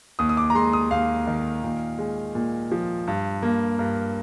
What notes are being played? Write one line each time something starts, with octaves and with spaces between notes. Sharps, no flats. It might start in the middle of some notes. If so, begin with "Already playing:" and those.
D#2 D#6
D#6
D6
A#5
G#3 C6
D#6
D#2 F5
D#3
A#2
G#3
A#2
F3
G2
A#3
G2 A#4